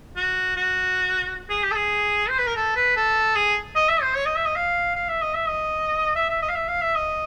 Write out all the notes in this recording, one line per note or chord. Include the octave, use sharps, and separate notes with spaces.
F#4
F#4
G#4
G4
A4
G#4
C5
B4
A#4
A4
B4
A4
G#4
D#5
E5
C5
C#5
D#5
E5
D#5
F5
F5
E5
D#5
E5
D#5
E5
E5
D#5
F5
E5
F5
E5
D#5